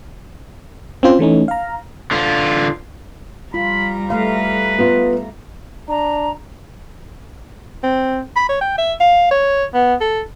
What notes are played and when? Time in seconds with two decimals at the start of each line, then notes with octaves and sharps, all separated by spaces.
1.03 C4 C#4 F4 C5
1.19 E3 A3 C#4 D#4
1.48 F5 A#5
2.11 D3 F4
3.54 G3 F4 A#5 B5
4.10 A3 B4 F5
4.78 B3 F4
5.89 D4 A#5
7.83 C4
8.36 B5
8.49 C#5
8.61 G5
8.78 E5
9.00 F5
9.31 C#5
9.74 B3
10.01 A4